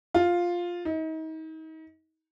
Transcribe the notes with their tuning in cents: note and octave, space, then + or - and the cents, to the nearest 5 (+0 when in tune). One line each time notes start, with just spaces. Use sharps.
F4 +5
D#4 +35